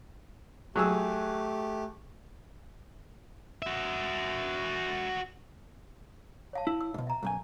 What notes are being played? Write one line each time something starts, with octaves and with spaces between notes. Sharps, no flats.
F#3 A3 G4 G#4 E6
F#4 E5
C#5 F5 A5
E4
E6
G#2 B2
E5 A#5
B1 F#2 G#5